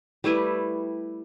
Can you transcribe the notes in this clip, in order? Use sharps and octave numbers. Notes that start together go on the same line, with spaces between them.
G3 A3 E4 B4